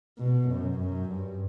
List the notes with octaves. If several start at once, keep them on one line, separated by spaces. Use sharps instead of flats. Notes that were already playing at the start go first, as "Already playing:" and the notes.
B2
F#2
F#2
G2